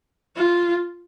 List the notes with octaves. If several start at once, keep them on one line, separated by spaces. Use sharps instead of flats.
F4